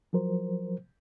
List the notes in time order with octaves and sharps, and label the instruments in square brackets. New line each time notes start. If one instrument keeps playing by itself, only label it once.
[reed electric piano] F3 F#3 A#4 C5